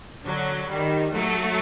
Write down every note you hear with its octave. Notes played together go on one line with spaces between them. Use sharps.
D3 F#3
D#3 G3
F#3 A3